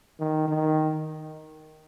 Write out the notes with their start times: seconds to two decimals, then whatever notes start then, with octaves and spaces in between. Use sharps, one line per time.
0.20 D#3
0.48 D#3